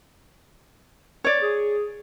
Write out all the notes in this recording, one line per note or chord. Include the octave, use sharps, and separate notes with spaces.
C#5 D5
G#4